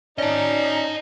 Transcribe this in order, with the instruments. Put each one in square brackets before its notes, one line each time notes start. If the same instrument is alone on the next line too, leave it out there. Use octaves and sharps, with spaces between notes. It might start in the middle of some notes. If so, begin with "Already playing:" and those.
[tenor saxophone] C#4 [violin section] D#4 [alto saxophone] D5 [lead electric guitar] D#5 A5